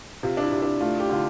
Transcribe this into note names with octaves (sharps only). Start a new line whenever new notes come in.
C3 F4
D4
E4
C3
D4
A3 F4
G4
D3 F4